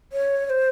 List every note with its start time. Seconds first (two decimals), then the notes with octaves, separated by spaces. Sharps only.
0.13 C#5
0.46 C#5
0.50 C5